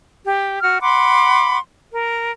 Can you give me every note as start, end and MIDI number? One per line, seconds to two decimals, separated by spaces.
0.25 0.57 67
0.60 0.79 66
0.60 0.79 89
0.80 1.57 78
0.80 1.57 83
0.80 1.57 84
0.80 1.57 86
1.93 2.30 70